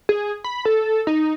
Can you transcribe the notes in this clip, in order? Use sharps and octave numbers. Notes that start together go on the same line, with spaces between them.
G#4
B5
A4
D#4